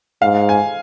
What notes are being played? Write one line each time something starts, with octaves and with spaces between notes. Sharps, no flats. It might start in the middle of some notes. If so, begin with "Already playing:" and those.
G#2 F5
G#5